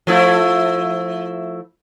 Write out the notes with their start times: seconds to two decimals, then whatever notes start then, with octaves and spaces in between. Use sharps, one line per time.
0.07 F3 A3 E4